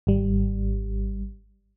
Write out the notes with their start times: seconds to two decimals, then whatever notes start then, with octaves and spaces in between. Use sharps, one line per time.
0.07 G#1 G3